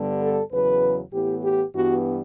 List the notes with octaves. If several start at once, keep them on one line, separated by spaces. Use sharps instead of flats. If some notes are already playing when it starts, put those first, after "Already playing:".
Already playing: G2 D3 G3 B3
A4
E2 C#3 F#3 B4
A2 E3 B3 G4
G4
G2 E3 G3 B3 F#4